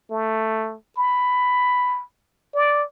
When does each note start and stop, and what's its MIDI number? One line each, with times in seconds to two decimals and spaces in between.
0.11 0.75 57
0.98 2.02 83
2.55 2.84 74